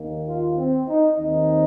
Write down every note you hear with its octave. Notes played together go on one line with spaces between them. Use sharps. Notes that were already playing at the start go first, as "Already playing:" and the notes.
Already playing: D#2 D#3 A#3
F4
C4
D#4
D#2 D#3 C4 D#4